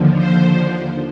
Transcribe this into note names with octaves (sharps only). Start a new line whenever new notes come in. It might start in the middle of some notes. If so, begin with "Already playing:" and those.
Already playing: D#2 D3 F3
C5